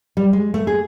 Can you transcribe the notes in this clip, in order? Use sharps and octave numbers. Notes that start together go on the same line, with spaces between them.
G3
G#3
A3
G#4